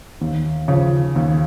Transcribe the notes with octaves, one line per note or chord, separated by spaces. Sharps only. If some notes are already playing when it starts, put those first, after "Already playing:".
D#2
C#3 F3
D#2